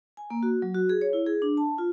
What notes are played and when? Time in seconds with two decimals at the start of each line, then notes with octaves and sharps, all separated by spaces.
0.17 G#5
0.30 A#3
0.43 F#4
0.62 F#3
0.75 F#4
0.89 G#4
1.01 C#5
1.13 E4
1.26 G#4
1.42 D4
1.57 A5
1.78 F4